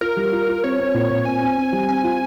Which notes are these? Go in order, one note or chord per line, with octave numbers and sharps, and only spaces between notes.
F4 A#4
G3
F4
F4
C4 C#5
C4
A#2
A#2
C4 G#5
C4
C4
G3
C4 G#5
F4